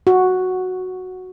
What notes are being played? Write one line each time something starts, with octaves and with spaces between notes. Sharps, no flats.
F#4